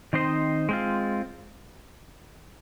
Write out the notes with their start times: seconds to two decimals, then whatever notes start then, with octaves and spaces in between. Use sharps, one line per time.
0.13 D#3 C4 D#4 C5 D#5
0.69 G#3 C4 F4